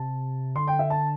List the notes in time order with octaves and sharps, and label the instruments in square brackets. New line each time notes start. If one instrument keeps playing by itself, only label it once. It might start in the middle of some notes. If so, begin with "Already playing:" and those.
Already playing: [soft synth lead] C3 [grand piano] A5
[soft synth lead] D3 [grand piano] C6
[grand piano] G5
E5
A5